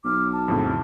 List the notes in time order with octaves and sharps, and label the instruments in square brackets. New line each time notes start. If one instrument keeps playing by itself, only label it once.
[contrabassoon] B1 [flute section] D6 F6
[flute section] A5
[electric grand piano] F2 A2 C#3